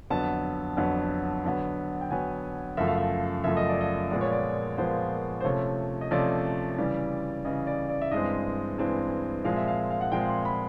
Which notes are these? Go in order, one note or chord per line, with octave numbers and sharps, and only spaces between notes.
F2 D3 F#3 B3 A5
F2 D3 F#3 B3
D3 F#3 B3
G5
D3 F#3 B3 G#5
F#2 C#3 F3 A3 E5
F5
E5
F#2 C#3 F3 A3 E5
D#5
D5
D#5
A#2 F3 G#3 B3 D5
C#5
D5
A#2 F3 G#3 B3 C5
C5
C3 F3 A3 C#4 C#5
D#5
C3 F3 A3 C#4 D5
C#3 E3 G3
C#3 E3 G3 D#5
D5
D5
E5
G2 E3 G#3 C4 D#5
G2 E3 G#3 C4
A#2 F3 G#3 C4 F5
E5
F5
F5
F#5
A#2 F3 G#3 C4 G5
C6
B5